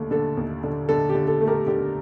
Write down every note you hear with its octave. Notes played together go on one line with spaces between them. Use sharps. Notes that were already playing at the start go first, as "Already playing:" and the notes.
Already playing: D#2 D3 A3
D3 A4
D#2
D3
D3 A4
G4
D3
A4
A3
G4 A#4
D3 G4